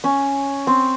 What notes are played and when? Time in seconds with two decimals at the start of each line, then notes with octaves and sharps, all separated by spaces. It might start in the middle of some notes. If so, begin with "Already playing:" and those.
0.04 C#4
0.67 C4